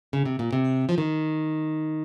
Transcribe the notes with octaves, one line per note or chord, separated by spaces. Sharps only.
C#3
C3
A#2
C3
F3
D#3